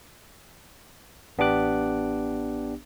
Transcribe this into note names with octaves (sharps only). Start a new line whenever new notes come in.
A1 B3 D4 G4 D6 F#6